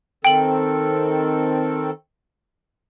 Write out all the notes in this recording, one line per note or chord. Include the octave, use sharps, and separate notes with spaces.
D#3 C4 A4 G5 F#7